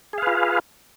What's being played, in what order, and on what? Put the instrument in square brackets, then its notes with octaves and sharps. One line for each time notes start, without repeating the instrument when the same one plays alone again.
[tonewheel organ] G#4
F5
B4
F4